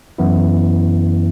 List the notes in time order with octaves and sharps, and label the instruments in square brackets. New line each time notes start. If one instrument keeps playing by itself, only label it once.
[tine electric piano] F#2 E3 B3 E4